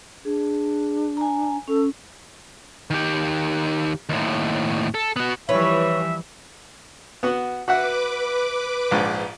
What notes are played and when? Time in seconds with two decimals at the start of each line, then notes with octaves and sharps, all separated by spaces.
0.25 D4 G#4
1.17 G#5 A#5
1.68 C#4 A4
2.90 D#3 G4
4.09 D#2 A2
4.95 A4
5.16 B3 F#4
5.49 E3 F3 G3 B4 C#5 E5
7.23 B3 F#4
7.68 F#4 B4 E5 F#5 D6
8.91 A#1 G#2